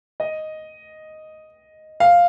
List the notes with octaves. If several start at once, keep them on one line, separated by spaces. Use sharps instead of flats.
D#5
F5